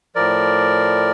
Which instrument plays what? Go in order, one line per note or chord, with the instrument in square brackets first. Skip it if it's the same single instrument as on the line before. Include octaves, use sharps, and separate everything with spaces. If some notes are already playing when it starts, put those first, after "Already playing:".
[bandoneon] A2 F3 A#4 D5